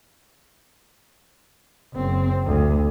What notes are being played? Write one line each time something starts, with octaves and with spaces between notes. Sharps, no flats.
F#1 C4
D2